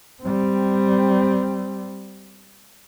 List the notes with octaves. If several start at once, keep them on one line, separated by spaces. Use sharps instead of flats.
G3 C4